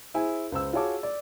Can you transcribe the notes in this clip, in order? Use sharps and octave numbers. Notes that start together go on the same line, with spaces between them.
E4 G#4 C5 G#5
C#2 C5 E6
F4 F#4 G#4 C#5 A5 D6
D5